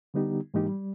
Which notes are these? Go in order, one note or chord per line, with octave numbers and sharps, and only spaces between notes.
D3 G3 B3 D#4 G4
G#2 E3 G#3 A#3 D#4 G4
G3